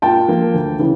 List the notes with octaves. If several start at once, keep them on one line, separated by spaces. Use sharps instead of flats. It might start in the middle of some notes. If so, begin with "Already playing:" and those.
A#2 G5 A5
F3 A#3
D2
C#3 E3